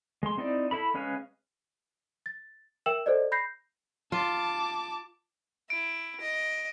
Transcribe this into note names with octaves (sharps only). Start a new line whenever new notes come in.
G#3 C6
C4 D#4 E4 D5
E4 A4 B5
G#3 C#4 B4 F5 G#5
A6
A#4 E5 G5 E6 E7 F#7
A4 C5 D5 D#5
B5 G6 A#6 C7
F4 A5 D6
E4 D7
D#5